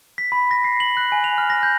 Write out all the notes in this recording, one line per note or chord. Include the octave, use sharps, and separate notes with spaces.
B6
B5
A#6
C7
F#7
F#6
G#5
F7
F6
A#6
G6